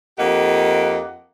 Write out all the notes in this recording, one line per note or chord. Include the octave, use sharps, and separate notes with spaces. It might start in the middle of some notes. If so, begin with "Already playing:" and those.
F2 A#3 D#4 G4 F#5